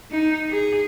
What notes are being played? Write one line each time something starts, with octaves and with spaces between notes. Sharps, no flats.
D#4
G#4